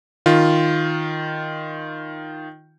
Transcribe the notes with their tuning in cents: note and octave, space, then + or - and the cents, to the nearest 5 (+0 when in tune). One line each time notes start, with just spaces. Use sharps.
D#3 +0 F4 +0